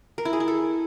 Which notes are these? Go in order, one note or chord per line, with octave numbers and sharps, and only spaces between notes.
A#4
E4
G#4
E4
A4